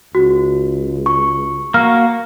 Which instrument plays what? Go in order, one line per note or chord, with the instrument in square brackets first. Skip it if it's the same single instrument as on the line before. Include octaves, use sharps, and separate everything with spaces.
[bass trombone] C#2 [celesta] F#4
[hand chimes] C#6
[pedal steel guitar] A#3 F#4 [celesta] F6